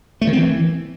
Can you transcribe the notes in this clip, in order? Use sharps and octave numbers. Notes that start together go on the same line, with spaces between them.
A3
D#3
C4
E3